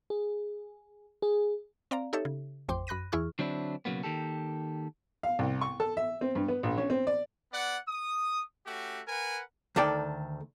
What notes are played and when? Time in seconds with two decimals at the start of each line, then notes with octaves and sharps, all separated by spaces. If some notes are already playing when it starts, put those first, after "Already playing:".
0.10 G#4
1.22 G#4
1.91 C4 D5 F5 A#5
2.13 D#4 G4 A4 C#5 E5
2.25 C#3
2.69 A1 F2 C5 G5 C6 D6
2.87 F#2 B5 F#6 A#6 D#7
3.12 E2 E3 E4 G#4 C#6 F6
3.39 D3 F#3 C4 D4 E4
3.85 B1 C#3 F#3 A#3 B3
4.04 D#3 A#3 G4 A4
5.23 F5
5.39 C2
5.61 C#6
5.80 A4
5.97 E5
6.21 C4
6.35 G2
6.48 B3
6.63 A#1
6.77 C#4
6.90 C4
7.07 D5
7.52 B3 D5 F#5
7.88 D#6
8.66 A3 C#4 F#4 G4
9.08 A#4 B4 F#5 G#5
9.76 D2 D#3 A4 D5 G5